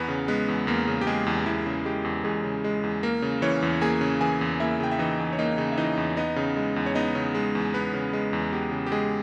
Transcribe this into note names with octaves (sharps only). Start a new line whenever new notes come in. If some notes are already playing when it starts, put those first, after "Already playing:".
Already playing: E2 B3 B4
C#3
G#3 B3 B4
E2
E2 A#3 A#4
C#3
G4
G#3 G#4
E2
E2 E4
C#3
G#3 G4
E2
E2 G#3 G#4
C#3
G#3
E2
A#3 A#4
C#3
E3 C#4 C#5
E2
A#3 G#4 G#5
C#3
E3 G#4 G#5
E2
A#3 E4 E5
C#3 G5
E5
E3 D#4 D#5
E2
C#5
A#3 D#4 D#5
C#3
E5
E3 D#4 D#5
E2
B3 D#4 D#5
C#3
G#3
E2
C#5
B3 D#4 D#5
C#3
G#3
E2
B3 B4
C#3
G#3
E2
B3 G4
C#3
G4
G#3 G#4